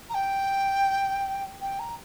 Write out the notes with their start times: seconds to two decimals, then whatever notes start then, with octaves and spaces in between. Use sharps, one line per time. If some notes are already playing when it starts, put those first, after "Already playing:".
0.09 A#5
0.14 G5
1.61 G5
1.79 A#5